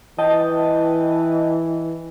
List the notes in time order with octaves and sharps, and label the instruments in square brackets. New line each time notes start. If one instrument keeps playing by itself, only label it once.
[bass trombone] E3 [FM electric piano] D#5 G5 A5